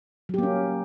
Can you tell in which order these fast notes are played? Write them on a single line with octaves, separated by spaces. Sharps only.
F#3 G4 A#3 C#4